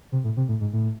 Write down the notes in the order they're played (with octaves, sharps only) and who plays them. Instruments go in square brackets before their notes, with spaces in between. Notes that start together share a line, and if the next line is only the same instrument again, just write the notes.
[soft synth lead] C3
A2
C3
A2
G#2
A2